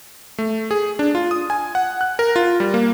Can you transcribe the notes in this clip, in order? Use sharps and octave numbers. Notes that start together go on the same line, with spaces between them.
A3
G#4
D4
F4
D#6
G#5
F#5
F#6
A#4
F4
G3
A#3